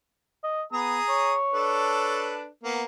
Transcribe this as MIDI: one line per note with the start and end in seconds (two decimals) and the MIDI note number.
0.44 0.63 75
0.73 0.98 59
0.73 1.34 68
0.73 1.34 82
0.73 1.34 87
1.09 2.33 73
1.53 2.47 62
1.53 2.47 69
1.53 2.47 71
2.64 2.84 58
2.64 2.84 59